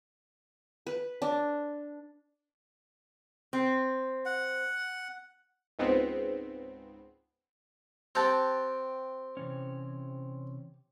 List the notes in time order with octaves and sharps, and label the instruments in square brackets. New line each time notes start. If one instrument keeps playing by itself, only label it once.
[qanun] B4
D4
[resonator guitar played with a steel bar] C4
[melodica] F#5
[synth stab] C#2 G#2 B3 C4
[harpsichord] C4 [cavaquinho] G4 F#5 A5
[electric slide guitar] C3 E3 C#4